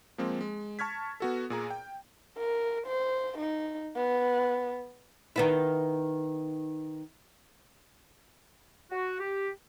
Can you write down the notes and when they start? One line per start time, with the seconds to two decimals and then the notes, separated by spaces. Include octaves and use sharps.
0.18 F3 G#3 A#3 C4
0.41 G#3
0.79 A5 C#6 F6 G#6 B6
1.20 B3 F#4 A4
1.50 A#2 G#4 A#5
1.70 G5
2.38 A#4
2.87 C5
3.38 D#4
3.96 B3
5.36 D#3 B3 E4
8.91 F#4
9.20 G4